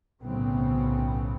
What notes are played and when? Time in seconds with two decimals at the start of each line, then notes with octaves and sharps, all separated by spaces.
0.23 B1 A2 C#3 B3 C4